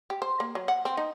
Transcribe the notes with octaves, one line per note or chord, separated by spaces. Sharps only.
G4
C5
A#3
F#3
F#5
C4
D#4